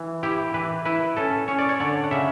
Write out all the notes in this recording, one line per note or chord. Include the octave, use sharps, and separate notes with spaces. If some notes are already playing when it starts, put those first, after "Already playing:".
Already playing: E3
E4 G4
E3 B4
E4 B4
C#4 A4
C#4 C#5
D5
C#5
D3 D5
F#5
C#3 E5